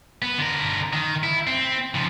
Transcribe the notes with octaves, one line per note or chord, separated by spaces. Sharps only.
B3
D3 A#4
D#3
E4
C4
C#3 F3